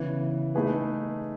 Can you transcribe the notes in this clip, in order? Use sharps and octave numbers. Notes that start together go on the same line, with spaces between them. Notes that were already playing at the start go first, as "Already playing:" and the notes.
Already playing: C#3 E3 B3
A3 D#4 G#4 B4